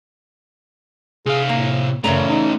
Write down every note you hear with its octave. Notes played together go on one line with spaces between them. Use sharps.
C3 G#4 F5
A2 A#3
F#2 C#3 A3 C#4 D5 A#5
D#4